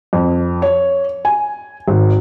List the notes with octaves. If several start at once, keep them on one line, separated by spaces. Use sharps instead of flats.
F2
C#5
G#5
G#1